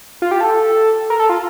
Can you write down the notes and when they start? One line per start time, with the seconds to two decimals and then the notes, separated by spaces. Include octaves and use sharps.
0.22 F4
0.31 G4
0.41 A4
1.10 A#4
1.19 A4
1.29 F4